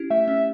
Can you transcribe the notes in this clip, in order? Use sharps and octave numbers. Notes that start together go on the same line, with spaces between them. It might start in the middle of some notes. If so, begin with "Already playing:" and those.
Already playing: C#4 E4 G4
A3 E5
C#4